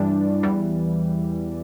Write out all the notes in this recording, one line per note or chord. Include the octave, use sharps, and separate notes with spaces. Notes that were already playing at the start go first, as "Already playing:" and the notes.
Already playing: G2 E3 G3 D4
E2 E3 G3